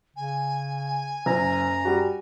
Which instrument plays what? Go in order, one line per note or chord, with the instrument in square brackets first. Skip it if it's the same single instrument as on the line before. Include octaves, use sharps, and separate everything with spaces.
[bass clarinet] C#3 [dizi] G#5
[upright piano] F#1 [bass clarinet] F#2 [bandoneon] A#5
[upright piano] G3 F#4